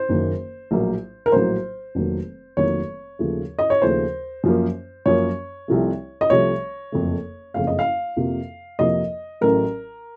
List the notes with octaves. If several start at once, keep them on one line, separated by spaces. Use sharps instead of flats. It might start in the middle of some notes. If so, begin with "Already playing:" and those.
Already playing: C5
F#1 F#2 D#3 A#3
A#1 A2 F#3 A#3
A#4
A#1 A2 F#3 A#3 C5
F1 F2 D#3 F#3 A#3
F1 F2 D#3 F#3 A#3 C#5
D#2 C#3 F3 A3
D#5
C#5
D#2 C#3 F3 A3 C5
F#2 F3 A#3
F#2 F3 A#3 C#5
C2 C3 F3 A3
D#5
C2 C3 F3 A3 C#5
F#1 F2 C#3 A3
F#1 F2 C#3 A3 F5
D#5
F5
F2 C3 F3 A#3
F2 C3 F3 A#3 D#5
A1 A2 F#3 A3 A#4